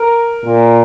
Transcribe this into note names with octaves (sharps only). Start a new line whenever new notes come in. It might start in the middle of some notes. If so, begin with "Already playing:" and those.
Already playing: A#4
A#2